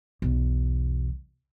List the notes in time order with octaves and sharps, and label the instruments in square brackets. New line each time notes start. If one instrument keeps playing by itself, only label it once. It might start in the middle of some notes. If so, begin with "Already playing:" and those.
[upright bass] B1 E2